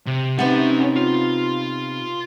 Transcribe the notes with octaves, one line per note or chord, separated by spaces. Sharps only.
C3
C3 B3 C#4 D#4 F#5
F4